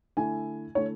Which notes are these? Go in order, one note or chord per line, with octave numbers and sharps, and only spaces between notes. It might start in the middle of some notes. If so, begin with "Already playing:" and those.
D3 A3 E4 G#5
D3 A3 E4 C#5